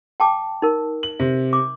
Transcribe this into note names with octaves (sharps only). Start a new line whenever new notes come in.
G5 A5 D6
D#4 A#4
F#7
C3
D6